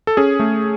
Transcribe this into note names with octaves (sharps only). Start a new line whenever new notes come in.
A4
C#4 G#4
A3